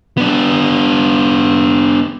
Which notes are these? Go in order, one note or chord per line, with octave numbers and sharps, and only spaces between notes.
B3 D4